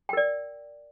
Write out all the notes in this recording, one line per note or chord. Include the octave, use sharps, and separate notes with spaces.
A#4 D5 G5